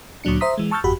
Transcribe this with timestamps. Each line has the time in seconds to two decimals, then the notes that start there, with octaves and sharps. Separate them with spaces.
0.24 D2 A#2 F#3 D4 C#7
0.41 C5 E5 A#5 C6 D#6 B6
0.58 E3 G#3
0.71 A5 C#6 E6 F6 G6 A6
0.84 G1 F2 F#4 G4 B5